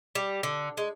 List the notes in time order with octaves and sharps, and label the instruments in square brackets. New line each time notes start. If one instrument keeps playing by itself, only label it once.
[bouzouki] G3
D3
G#3